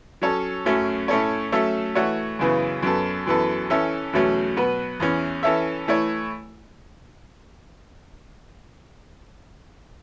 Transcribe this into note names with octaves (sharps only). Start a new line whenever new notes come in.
F#3 C#4 A4 C#5
F#2 F#3 A3 C#4
A2 A3 C#4 A4 C#5
F#3 A3 C#4 A4 E5
E3 A3 F#4 C#5
F#2 C#3 E3 B3
F#2 F#3 B3 A4
F#2 E3 B3 A4
E3 C#4 A4 E5
E2 B2 F#3 A3 C#4
B2 F#3 B3 F#4 B4
E2 E3 C#4
E3 C#4 A4 E5
E3 A3 E4 C#5